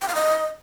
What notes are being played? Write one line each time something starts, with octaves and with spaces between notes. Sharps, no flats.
G5
F5
D#5